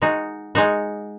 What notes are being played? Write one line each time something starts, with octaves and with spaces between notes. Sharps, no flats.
G#3 D#4 F#4
G#3 D#4 F#4